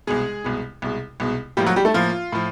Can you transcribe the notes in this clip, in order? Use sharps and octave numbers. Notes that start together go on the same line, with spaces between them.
C2 B2 G#3 G#4
C2 B2 G#3
C2 B2 G#3
C2 B2 G#3
A2 F3 G3 A#3 G4
F#3 F#4
G3 G4
A3 A4
A2 F3 A#3 F4
A2 F3